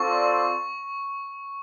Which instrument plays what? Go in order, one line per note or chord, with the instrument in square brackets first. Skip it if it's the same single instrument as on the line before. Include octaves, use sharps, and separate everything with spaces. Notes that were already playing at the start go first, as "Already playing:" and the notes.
Already playing: [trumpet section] C4 F4 A4 D5 [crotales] C#6